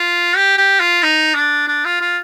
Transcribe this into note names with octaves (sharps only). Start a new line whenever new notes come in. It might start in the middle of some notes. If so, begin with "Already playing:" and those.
Already playing: F4
G4
G4
F4
D#4
D4
D4
F4
F4